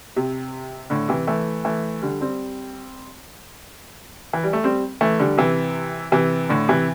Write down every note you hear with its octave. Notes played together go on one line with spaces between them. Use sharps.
C3
A2 D3
C3 E3
E3 A3
E3 A3
D3 G3
G3 C4
E3
G3
A3
G3 C4
E3 A3
D3 G3
C3 E3
C3 E3
A2 D3
C3 E3